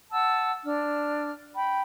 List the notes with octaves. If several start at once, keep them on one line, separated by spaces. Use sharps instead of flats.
F#5 A5 E6
D4 F6
G5 B5